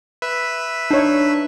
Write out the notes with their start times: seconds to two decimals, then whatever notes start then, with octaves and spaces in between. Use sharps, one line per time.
0.22 B4 E5
0.91 D4 D#4 C#5